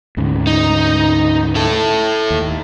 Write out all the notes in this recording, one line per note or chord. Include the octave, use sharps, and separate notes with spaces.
D2 G#2 C#3
D#4
E4 A4
D#2